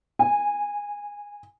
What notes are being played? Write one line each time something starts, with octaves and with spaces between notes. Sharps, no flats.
G#5